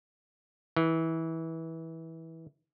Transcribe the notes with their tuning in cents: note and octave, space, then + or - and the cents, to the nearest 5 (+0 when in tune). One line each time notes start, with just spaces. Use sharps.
E3 -20